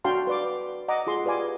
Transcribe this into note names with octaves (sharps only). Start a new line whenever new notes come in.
D4 F#4 F5 G5 A5 C6
B4 D5 D6
D#5 F#5 A#5 D6
F4 G#4 C6
G4 B4 D5 F5 G#5 D6